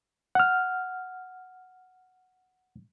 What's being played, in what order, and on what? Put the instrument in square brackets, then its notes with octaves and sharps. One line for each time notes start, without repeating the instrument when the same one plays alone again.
[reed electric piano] F#5 F6